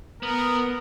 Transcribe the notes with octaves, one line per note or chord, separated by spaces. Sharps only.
B3 A#4